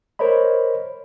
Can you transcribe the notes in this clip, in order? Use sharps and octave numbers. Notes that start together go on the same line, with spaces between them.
A#4 C5 C#5 D#5 B5